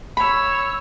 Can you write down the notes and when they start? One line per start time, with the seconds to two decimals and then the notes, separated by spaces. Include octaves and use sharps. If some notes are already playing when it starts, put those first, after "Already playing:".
0.17 C#5 B5 E6